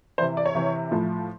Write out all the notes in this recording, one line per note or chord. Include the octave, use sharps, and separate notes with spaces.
C3 E3 C5
D5
C#5
C3 E3
A2 F3